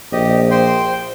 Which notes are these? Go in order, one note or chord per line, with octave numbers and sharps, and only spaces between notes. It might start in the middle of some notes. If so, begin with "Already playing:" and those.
A#1 G4 D#5
C5 G5 C6